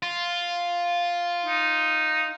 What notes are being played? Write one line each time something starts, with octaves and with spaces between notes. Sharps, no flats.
F4
D#4